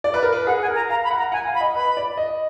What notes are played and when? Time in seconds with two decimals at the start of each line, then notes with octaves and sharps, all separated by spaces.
0.04 D5
0.14 B4
0.23 A#4
0.33 B4
0.47 G#4 F#5
0.62 G#5
0.68 A#4
0.75 A#5
0.89 F5 A#5
1.04 B5
1.11 F#5
1.18 A#5
1.32 F#5 G#5
1.47 F5
1.54 B5
1.61 D#5
1.75 B4 B5
1.97 D5
2.17 D#5